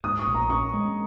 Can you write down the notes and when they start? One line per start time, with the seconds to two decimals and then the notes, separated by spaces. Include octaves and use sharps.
0.04 G#2 D#6
0.19 C#6
0.27 A#1
0.35 A#5
0.50 C#4 C#6
0.74 G#3